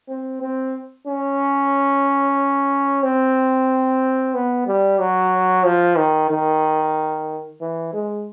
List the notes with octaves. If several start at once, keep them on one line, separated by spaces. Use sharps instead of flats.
C4
C4
C#4
C4
B3
G3
F#3
F3
D#3
D#3
E3
G#3